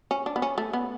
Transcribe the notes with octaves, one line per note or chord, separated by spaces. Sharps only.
C#4
D4
B3
C#4
A3
B3